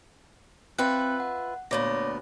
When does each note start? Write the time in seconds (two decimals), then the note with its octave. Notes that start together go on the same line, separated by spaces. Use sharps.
0.78 C4 F4 B4 E5 G5 F#6
1.20 F#5
1.71 D2 A#2 B3 C#5 D6 A#6